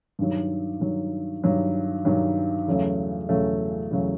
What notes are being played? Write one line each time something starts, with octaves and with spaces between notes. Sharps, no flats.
G2 D#3 F#3
G2 D#3 F#3
G2 D#3 F#3
G2 D#3 F#3
E2 C#3 F#3 A3
E2 C#3 F#3 A3
E2 C#3 F#3 A3